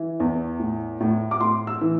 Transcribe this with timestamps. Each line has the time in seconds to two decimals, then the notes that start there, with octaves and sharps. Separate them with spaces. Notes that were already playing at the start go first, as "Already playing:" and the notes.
Already playing: E3
0.20 E2
0.59 A2
1.00 A2
1.31 D6
1.41 A2 C6
1.67 E6
1.81 E3